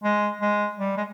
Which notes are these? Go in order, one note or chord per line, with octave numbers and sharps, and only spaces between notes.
G#3
G#3
G3
G#3